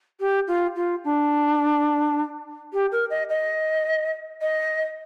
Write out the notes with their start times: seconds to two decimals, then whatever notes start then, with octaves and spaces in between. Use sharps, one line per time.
0.20 G4
0.47 F4
0.76 F4
1.04 D4
2.73 G4
2.92 A#4
3.10 D#5
3.30 D#5
4.42 D#5